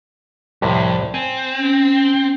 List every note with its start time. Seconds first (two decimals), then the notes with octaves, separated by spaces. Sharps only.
0.62 C2 F2 A2 C3
1.14 C4 G#5
1.58 C#4